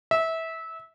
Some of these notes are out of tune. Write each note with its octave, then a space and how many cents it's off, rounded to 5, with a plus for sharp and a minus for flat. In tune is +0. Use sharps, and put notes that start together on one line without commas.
E5 -20